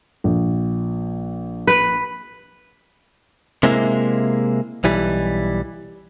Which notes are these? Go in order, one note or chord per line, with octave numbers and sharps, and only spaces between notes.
A#1
B4
C3 G#3 A#3 E4
B1 E3 G3